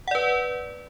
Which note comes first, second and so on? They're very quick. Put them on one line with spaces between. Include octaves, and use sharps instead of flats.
F#5 D5 B4